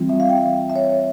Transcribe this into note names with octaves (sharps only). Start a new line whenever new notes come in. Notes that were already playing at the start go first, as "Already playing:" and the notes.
Already playing: E3 G3 C4 F4
E5
F5
G5
E5
C#5